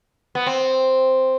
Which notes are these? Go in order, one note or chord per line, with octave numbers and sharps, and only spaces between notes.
B3
C4